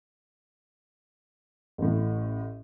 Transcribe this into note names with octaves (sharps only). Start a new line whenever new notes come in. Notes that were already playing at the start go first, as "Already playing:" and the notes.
A1 A2